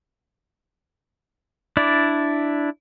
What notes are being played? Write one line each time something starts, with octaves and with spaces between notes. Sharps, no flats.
D4 E4 D5